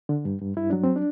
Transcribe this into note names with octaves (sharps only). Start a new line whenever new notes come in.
D3
G2
G2
G2 E4
F#3 D4
C4
D4